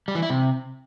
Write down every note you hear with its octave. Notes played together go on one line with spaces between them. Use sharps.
G3
E3
E4
C3